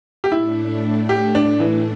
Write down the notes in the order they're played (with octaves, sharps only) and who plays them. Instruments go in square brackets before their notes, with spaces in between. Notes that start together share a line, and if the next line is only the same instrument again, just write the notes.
[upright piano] G4
[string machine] A2 A3 D4 [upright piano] E4
[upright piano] G4
D4
E3